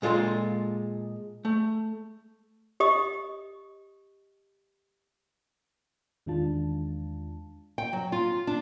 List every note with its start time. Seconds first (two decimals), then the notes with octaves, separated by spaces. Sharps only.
0.02 A#2 G#3 F4 A4 C6
1.45 A3
2.80 G4 D#5 D#6
6.26 E2 D#3 G#3 D4 F4 A5
7.78 G5
7.93 F#3
8.12 F4
8.47 D4